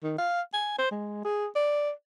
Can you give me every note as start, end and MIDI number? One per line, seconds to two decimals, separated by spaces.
0.03 0.14 51
0.18 0.41 77
0.53 0.75 80
0.78 0.90 72
0.91 1.20 56
1.24 1.47 68
1.55 1.90 74